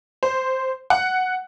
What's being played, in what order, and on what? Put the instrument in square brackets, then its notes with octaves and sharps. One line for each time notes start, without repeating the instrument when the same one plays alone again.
[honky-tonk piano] C5
F#5